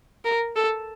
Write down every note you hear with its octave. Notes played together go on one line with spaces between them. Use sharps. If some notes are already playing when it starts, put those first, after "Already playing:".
A#4
A4